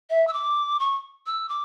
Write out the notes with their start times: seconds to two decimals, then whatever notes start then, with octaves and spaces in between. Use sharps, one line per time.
0.10 E5
0.27 E6
0.33 D6
0.80 C#6
1.26 E6
1.49 D6